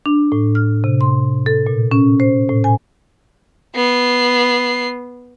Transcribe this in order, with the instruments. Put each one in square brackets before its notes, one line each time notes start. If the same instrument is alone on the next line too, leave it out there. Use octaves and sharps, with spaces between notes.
[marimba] D4
A2
F6
C3
C6
A4
A#2
C#4
C5
A2
G#5
[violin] B3 C7